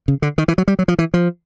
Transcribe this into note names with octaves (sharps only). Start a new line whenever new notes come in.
C#3
D3
D#3
E3
F#3
G3
F#3
F3
E3
F3